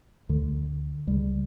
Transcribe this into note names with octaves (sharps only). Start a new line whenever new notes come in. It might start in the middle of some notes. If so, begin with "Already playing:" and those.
D2 D3
C#2 C#3 G3